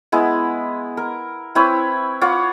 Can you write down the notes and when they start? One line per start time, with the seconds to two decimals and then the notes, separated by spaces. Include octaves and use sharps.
0.12 G#3 B3 E4
0.97 A#4
1.55 C4 E4 B4 C#5
2.21 F4 C#5 F#5 D6